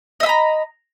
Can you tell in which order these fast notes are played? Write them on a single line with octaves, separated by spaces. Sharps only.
D#5 E5 B5 A#5